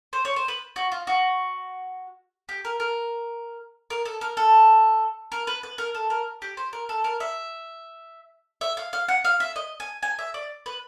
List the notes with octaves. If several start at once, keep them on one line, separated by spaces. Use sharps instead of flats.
C5
C#5
C5
B4
F#4
F4
F#4
G4
A#4
A#4
A#4
A4
A#4
A4
A#4
B4
B4
A#4
A4
A#4
G4
C5
A#4
A4
A#4
E5
E5
F5
F5
F#5
F5
E5
D#5
G#5
G#5
E5
D5
B4